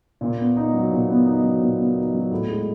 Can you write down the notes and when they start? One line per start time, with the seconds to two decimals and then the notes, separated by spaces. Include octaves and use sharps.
0.21 A#2
0.38 B3
0.57 D#4
0.73 F#3
0.91 A#2
1.09 B3
1.26 D#4
1.43 F#3
1.61 A#2
1.79 B3
1.96 D#4
2.14 F#3
2.31 A2
2.49 G#3